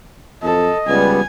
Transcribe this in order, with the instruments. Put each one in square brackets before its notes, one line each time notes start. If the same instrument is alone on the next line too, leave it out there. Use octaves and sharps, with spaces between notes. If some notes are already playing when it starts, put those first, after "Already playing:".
[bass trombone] F2 [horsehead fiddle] A4 [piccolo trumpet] D#5
[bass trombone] C#2 [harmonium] G3 B3 [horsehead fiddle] G#5